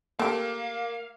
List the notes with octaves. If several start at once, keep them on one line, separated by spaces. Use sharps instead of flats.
A3 A#3 G4 F5